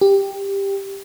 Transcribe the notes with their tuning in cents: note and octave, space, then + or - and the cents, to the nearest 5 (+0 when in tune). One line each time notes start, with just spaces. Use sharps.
G4 +10